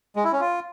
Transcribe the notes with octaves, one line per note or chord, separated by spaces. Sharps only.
G#3
E4
C#4
F4